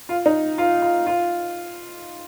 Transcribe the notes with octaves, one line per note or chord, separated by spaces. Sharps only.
F4
D#4
F4
F4
F4